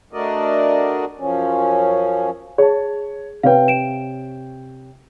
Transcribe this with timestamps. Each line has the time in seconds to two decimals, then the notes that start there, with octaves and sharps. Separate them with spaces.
0.13 A3 D4 F#4 A#4 D5 D#5
1.19 F#2 F3 C#4
2.58 G#4 C#5 A5
3.43 C3 B4 C#5 F5 G5
3.68 D7 E7